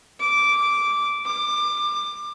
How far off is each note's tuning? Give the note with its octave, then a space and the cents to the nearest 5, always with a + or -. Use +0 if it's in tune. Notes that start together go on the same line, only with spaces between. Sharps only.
D6 -10
D6 +25